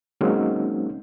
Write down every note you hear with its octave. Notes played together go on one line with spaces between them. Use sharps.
F#3 G#3 A#3 C4 C#4 D#4